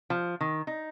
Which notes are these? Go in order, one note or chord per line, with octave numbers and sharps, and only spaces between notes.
F3
D#3
D#4